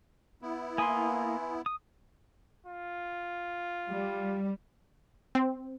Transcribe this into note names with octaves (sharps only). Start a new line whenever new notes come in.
B3 E4
A#3 G#5 B5 C6 D#6
D#6
F4
G3
C4